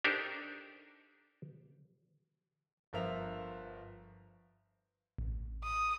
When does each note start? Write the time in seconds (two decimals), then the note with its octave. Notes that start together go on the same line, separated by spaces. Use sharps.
0.04 D4 D#4 G4 A4 A#4 C5
2.93 G1 F3 A#4 E5 F7
5.18 A1
5.63 D#6